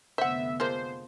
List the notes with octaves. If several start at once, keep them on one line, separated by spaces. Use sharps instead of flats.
F1 D3 B3 C5 E5 F#5
F3 G#3 A#3 C5